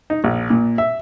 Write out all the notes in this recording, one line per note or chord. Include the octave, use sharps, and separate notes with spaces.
D#4
A#1
A#2
E5